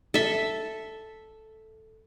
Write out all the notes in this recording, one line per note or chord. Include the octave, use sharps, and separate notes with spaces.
A4 E5